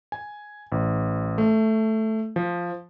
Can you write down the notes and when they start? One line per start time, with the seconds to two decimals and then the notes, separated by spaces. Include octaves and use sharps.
0.12 G#5
0.72 A1
1.38 A3
2.36 F3